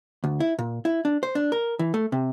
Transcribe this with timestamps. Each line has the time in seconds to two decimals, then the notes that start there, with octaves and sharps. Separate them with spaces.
0.24 D2
0.40 E4
0.59 A#2
0.85 E4
1.05 D4
1.23 C5
1.35 D4
1.52 A#4
1.79 E3
1.94 A3
2.12 C3